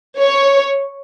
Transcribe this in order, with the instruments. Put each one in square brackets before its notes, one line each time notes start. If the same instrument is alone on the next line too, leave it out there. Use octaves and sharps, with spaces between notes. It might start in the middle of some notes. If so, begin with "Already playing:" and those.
[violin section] C#5